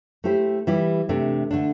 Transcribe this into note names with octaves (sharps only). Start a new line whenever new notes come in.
A3 E4 G4 C5
E3 G3 E4 G4
C3 A3 D4
D3 A3 D4